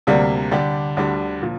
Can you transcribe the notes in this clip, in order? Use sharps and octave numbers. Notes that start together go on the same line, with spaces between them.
D2 C3 G3 A#3 D4
D3 G3 D4 G4 D5
D2 D3 G3 D4
A#2 F3